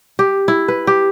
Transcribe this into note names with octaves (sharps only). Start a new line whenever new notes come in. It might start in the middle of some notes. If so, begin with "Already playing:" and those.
G4
E4
B4
G4